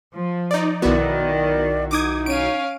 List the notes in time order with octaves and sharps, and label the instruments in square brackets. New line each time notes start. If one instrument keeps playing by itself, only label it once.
[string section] F3
[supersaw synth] D#4 D5
[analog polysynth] B1 E4 F#4 [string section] D#3 [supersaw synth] B3 [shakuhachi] D5
[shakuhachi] D#4 [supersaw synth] D6 D#6 G#6
[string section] C#4 F5 [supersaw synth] D7 D#7